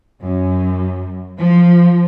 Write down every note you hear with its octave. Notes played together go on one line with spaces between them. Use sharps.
F#2
F3